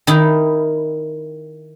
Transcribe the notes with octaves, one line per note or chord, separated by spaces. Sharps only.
D#3 D#4 E4